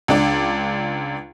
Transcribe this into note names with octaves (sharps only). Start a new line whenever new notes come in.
C#2 D4 D5